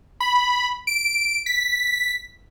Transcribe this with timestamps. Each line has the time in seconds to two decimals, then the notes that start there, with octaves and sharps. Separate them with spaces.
0.20 B5
0.87 D7
1.46 B6